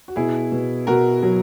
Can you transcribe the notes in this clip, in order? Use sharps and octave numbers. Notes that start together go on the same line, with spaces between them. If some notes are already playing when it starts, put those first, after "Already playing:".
F#4
B2 E4 G#4
B2
B2 F#4 A#4
F#3